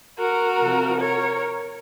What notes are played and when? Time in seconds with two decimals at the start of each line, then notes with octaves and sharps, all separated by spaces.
0.18 F#4 A#4
0.60 C3 F3
1.01 A#4 C#5